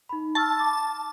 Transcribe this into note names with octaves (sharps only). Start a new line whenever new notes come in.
D#4 B5
A5 C#6 E6 F6
D6